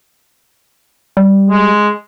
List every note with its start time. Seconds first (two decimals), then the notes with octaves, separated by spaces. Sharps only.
1.17 G3
1.50 G#3